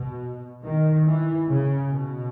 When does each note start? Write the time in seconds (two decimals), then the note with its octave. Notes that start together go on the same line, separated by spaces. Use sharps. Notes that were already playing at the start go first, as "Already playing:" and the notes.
Already playing: B2
0.63 D#3
1.06 E3
1.48 C#3
1.90 B2